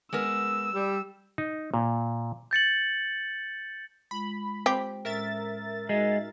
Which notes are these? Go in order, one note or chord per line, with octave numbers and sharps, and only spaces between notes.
G#3 B3 A#4 E6
G3
D#4
A#2
G6 A6 C#7 F#7
G#3 F4 B5
C4 G4
A2 G#3 C#4 A#4 E5 A6
G#3 D#4 F#4